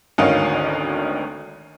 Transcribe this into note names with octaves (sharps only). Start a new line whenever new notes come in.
G#1 D2 D#3 C#4 D#5 F5